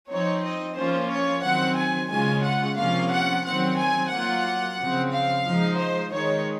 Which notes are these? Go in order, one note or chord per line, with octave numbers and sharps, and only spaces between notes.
F3 C4 D#4 C#5
D#5
F3 A#3 C#4 F4 C5
C#5
D#3 F#3 C4 F#5
G#5
C#3 G#3 C#4 F4 G#5
F#5
C3 F3 A#3 C#4 F4 F5
F#5
D#3 F#3 C4 F#5
G#5
F#3 A#3 F4 F#5
C#3 F3 C4
F5
F3 G#3 D#4
C5
D#3 G#3 D#4 C#5